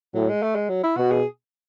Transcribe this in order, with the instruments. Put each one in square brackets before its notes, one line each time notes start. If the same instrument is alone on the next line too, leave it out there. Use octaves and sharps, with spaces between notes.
[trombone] A2 [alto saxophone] F#3
[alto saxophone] G#3
A3
G#3
F#3
E4
[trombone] B2 [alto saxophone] F#4
[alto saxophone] G#4